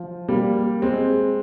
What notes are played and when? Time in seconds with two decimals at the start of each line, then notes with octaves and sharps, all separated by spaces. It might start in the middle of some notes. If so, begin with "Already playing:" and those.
Already playing: F3
0.29 G3 A#3
0.82 G#3 C4